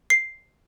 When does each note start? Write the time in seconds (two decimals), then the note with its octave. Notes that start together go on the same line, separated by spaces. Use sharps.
0.10 C7